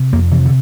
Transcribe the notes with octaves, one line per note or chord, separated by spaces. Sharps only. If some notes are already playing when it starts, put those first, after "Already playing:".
Already playing: C3
F2 A#3
C3 E3
D3